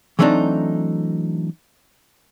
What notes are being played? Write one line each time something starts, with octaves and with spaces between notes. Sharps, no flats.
E3 F#3 A3 C4 D4 D#4